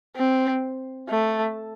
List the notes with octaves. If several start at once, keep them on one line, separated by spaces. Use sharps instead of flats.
C4
A3